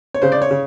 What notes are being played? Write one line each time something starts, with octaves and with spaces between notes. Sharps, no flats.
C#5
C#3 C5
D5
C#5
C#3